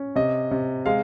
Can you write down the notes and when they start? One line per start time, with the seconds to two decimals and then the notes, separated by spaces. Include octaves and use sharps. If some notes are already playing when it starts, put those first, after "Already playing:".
Already playing: C#4
0.16 C3 D#5
0.51 C3
0.86 G#3 F5